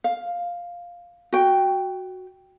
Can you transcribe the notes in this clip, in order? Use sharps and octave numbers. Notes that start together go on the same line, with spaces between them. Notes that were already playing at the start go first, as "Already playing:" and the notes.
F5
F#4 G5